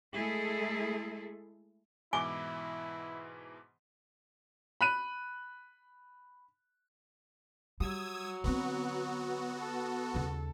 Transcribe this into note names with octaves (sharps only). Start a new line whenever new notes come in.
G#3 A3 E4 G#4 A4
G#2 B2 E3 E4 G#5 D6 G7
B5 F#6 D#7
F#3 G3 D#6 E6 G#6
D3 B3 C4 F#4
A4
D#2 C#3